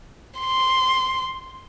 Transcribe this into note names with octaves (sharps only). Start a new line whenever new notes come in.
C6